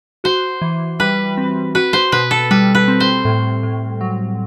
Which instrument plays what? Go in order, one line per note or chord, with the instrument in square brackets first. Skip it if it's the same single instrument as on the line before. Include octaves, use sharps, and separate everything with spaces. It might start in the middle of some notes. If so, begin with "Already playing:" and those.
[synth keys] F#4 [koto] C5
[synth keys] E3
[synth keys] G3 [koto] B4
[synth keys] C4
[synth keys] F#4 [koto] B4
[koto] C5
[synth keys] B2 [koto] B4
[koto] A4
[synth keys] G3 [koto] B4
[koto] B4
[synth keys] C4
[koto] C5
[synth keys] A2
A2
F#3